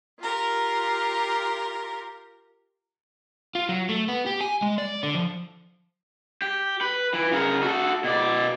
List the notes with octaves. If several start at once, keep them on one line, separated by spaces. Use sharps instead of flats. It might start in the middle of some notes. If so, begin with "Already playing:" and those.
F4 G4 A#4
F4
F#3
A3
B3
G4
G#5
G#3
D5
D3
F3
G4
B4
E3
C#3 A#4
F#4 A4
B2 D5